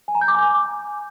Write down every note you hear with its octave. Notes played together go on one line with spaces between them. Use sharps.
G#5
A#5
G6
D6
G#5